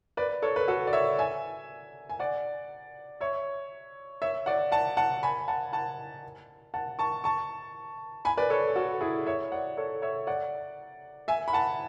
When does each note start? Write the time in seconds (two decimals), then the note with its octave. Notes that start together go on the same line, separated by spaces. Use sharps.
0.17 B4 D5
0.42 A4 C#5
0.56 B4
0.68 F#4 A4
0.87 D5
0.93 C#5 E5
1.19 E5 G#5
2.09 G#5
2.19 D5 F#5
3.21 C#5 E5
4.22 C#5 E5
4.46 D5 F#5
4.72 F#5 A5
4.97 F#5 A5
5.23 G#5 B5
5.48 F#5 A5
5.73 F#5 A5
6.74 F#5 A5
6.99 A5 C#6
7.24 A5 C#6
8.25 G#5 B5
8.38 B4 D5
8.50 A4 C#5
8.76 F#4 A4
9.01 E4 G#4
9.26 C#5 E5
9.52 D5 F#5
9.77 A4 C#5
10.02 C#5 E5
10.27 D5 F#5
11.28 E5 G#5
11.48 B5
11.53 F#5 A5